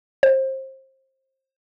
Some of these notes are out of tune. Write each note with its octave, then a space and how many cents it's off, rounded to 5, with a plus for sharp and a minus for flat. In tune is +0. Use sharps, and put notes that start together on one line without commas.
C5 +25